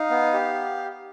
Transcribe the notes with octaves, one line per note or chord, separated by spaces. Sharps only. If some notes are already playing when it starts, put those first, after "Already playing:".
Already playing: D#4 F5
B3
G4